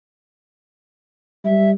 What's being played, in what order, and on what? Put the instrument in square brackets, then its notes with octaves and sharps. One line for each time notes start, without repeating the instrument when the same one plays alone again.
[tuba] G3 [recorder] E5